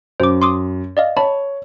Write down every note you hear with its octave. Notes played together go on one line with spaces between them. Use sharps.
F#2 C5 D6
C6 D6 D#6
D5 D#5 F5
C#5 A5 B5